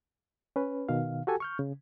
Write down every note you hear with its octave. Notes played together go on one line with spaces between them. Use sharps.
C#4 B4
B2 D#3 F5
F#4 G4 A4 G#5
C#6 F6 G6
C#3